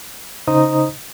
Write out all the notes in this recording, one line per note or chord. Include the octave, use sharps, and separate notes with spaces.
C#3 D#4 C5 D#5 A#5 D#6